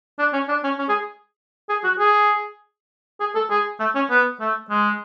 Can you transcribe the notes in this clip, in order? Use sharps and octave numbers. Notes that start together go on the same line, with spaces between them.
D4
C#4
D4
C#4
C#4
G#4
G#4
F#4
G#4
G#4
A4
G#4
A3
C#4
B3
A3
G#3